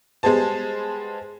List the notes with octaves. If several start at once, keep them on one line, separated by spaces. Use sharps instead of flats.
G3 G#3 B3 G#4 C5 A5